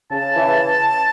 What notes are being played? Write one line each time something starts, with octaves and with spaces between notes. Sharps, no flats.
C#3 A5
E3